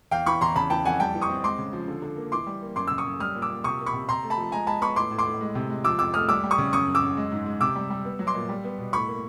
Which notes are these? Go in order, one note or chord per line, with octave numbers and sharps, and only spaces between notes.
E2 F5 G5
E3 B5 C#6
E2 A#5 C6
C#3 A5 B5
E3 G5 A5
F2 F#5 G#5
G3 G5 A5
E3
C#6 D#6
C4
G#3 C6 D6
C#3
F3
D3
D3
A#3
E3 C6 D6
G3
A#3
F#2 C6 D6
C#3 E6
C#6 D#6
F#2
G3 D#6 F6
A#2
D6 E6
A#2
C3 C#6 D#6
A#3
B5 C#6
C3
C3 A#5 C6
A3
A5 B5
F3
G#3 G#5 A#5
G#3 A5 B5
B3 B5 C#6
A2 C6 D6
A2
C6 D6
A2
G#3
C3
G#3
F3 D6 E6
F2 D6 E6
A3 D#6 F6
G3 D6 E6
G3
C#6 D#6
C#3
F#2 C#6 D#6
F#2
D6 E6
F#2
G#3
G#2
G#3
C3 D6 E6
G3
G3
B3
F#3
C6 D6
A#2
G3
B3
B2
A2 B5 C#6
A#3